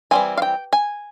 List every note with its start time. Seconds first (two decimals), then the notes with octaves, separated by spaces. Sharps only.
0.11 E3 G3 C4 G#5
0.37 F5
0.42 G5
0.73 G#5